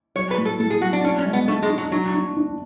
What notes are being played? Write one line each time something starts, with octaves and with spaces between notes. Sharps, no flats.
F#3 C#5
B4
A2
A4
A2 A4
G#4
F#3 F#4
D4
C#4 D4
C#4
G#3
B3
A3 D4
G#3
D4
F#3
F#3 D4
D4
D4